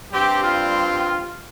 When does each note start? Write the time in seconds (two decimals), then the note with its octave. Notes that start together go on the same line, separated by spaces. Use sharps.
0.13 G2 G3 C4 G4
0.44 F4